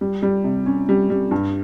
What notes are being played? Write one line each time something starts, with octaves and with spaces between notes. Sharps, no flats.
G3
G3
C3
C#4
G3
G3
G2